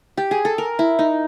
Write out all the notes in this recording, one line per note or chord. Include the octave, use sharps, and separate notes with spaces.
G4
G#4
A4
A#4
E4
D#4